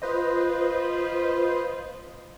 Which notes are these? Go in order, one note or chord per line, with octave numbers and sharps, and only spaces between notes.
F4 B4 C5 D#5